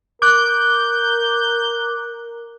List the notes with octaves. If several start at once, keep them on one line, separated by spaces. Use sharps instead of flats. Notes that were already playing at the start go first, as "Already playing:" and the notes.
A#4 D6 F#6 G6